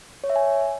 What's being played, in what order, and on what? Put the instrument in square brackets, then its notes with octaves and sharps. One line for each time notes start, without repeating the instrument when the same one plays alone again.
[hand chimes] C#5
E5
G#5